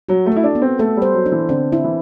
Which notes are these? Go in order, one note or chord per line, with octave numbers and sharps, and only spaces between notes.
F#3 F#4
A3
E4 A4
D4
B3
C4
A3 A4
G3 C5
F#3
D4
E3
D3 C4
E4
E3